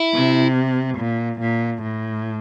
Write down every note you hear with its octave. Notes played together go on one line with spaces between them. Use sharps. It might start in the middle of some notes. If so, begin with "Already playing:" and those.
Already playing: E4
C3
A#2
A#2
A2